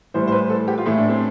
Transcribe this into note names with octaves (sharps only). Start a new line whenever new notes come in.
A2 E3 G3 C5
C5
B4
A4
G4
F4
A2 E3 A3 E4
D4
C4